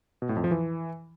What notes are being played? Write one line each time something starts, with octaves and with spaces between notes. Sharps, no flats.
B2
A2
F2
F3
E3